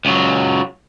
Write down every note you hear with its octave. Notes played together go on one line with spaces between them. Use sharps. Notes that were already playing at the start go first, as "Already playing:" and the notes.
C#2 F#3